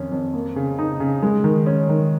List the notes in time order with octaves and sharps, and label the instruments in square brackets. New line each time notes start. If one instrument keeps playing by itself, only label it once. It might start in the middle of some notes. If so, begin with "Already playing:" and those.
Already playing: [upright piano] F2 D#3 C#4
F2
A#3
C#3
D#4
C#3
G#3
D#3
C#4
D#3